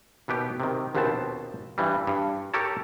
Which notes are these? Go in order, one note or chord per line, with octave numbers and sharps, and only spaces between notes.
D#2 B2 B3 G4
C3 D#3
A#1 D#2 B2 B3 C4 A5
G2 E3 G3
G2
G4 A4 A#4 C#5 A5